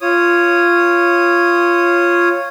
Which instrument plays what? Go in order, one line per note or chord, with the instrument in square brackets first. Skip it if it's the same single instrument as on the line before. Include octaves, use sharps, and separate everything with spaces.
[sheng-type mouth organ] F4 C#5 D#6